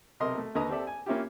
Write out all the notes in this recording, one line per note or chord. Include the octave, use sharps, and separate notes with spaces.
B1 C3 A#4 D#5 C6
A3
D#2 D3 B4 D#5 A#5 D#6
C4 G4 A4 D5 E5
G#5
A#3 C#4 E4 F4 G4